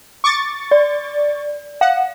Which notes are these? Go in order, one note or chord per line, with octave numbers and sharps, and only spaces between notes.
C#6 D6 A6
D5
F5 F#5